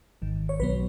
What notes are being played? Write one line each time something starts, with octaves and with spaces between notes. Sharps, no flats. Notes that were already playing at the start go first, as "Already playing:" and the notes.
G#1 G#2 D#3
C#5
B1 B2 F#3 B3 B4